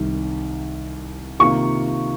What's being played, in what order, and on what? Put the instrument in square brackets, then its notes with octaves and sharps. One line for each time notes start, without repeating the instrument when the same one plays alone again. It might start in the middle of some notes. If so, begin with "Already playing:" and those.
Already playing: [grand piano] C2 C3 D#3 G3
[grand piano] C3 D#3 A#3 F4 [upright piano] C#6